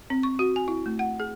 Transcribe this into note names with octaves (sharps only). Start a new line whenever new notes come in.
C4
C#6
F#4
G#5
E4
A3
F#5
G#4